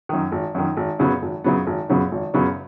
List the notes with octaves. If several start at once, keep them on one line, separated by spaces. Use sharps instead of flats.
F#2 D#3
G#1
F#2 D#3
G#1
F#2 C#3 F#3 B3
G#1
F#2 C#3 F#3 B3
G#1
F#2 C#3 F#3 B3
G#1
F#2 C#3 F#3 B3